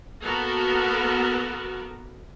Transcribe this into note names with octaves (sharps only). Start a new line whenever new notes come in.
A#3 B3 F#4 A4 A#4